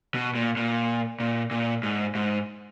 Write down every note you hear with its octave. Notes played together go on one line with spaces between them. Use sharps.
B2
A#2
A#2
A#2
A#2
G#2
G#2